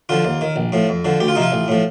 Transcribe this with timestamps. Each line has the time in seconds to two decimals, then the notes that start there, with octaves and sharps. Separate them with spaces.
0.09 D3 F3 F4
0.25 D#2
0.41 D#3
0.56 A#1
0.72 A2 F3
0.89 F2
1.05 D3 F3
1.20 D2 G4
1.28 F4
1.35 C3 F3 D#4
1.42 F4
1.52 A1
1.68 A2 F3